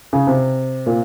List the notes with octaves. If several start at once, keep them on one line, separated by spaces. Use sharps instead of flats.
C#3
C3
A#2